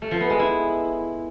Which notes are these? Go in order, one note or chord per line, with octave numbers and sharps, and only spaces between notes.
A3
F3
B3
G#3
E4